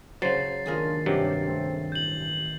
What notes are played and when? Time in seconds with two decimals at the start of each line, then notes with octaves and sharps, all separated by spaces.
0.22 C#3 F#3 C5 A6 C7
0.66 D#2 G#2 D4 F4 G#4 A#4
1.06 G2 C3 F#3 C#4 D4 G4
1.44 C#3 A3 C4
1.92 A1 G6 F#7